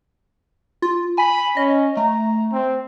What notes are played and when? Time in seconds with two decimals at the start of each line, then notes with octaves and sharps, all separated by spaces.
0.82 F4
1.18 G#5 B5
1.57 C#4 D#5
1.97 A3 A#5
2.52 C4